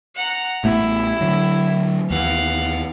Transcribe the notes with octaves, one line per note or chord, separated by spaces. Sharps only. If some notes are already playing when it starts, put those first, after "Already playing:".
F#5 A#5
A1 A3 B3 E4
D3 F#3
D#2 E3 F5 F#5